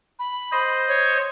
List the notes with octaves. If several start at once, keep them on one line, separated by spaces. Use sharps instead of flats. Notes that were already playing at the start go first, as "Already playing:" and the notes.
B5
C5 D#5
C#5